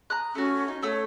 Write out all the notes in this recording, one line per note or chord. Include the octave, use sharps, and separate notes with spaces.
A#5 D#6 F#6
A3 C#4 F#4
D#4
A3 C#5 E6